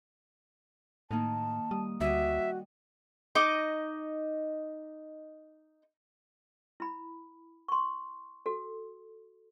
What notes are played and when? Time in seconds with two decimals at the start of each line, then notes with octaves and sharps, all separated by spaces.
1.11 A2 D#3 A#3 D#4 A5
1.71 G3 D#6
2.00 D2 G3 F#4 D#5 E5
3.35 D#4 D#5 D6
6.80 E4 B5
7.68 C6 C#6
8.46 F#4 A4